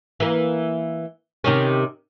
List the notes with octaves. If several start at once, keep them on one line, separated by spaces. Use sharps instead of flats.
E3 A#3
C3 D#3 C#4